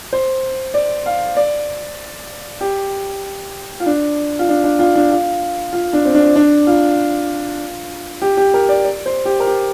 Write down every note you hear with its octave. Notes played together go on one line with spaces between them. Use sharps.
C5
D5
F5
D5
G4
F4
D4
F4
D4
D4
F4
D4
F4
F4
D4
C4
D4
D4
F4
G4
G4
A#4
D5
D5
C5
G4
A#4
G4